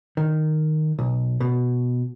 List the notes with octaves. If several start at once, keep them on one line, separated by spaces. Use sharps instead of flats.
D#3
B1
B2